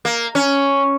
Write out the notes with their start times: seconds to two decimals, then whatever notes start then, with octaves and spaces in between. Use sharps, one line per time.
0.05 A#3
0.35 C#4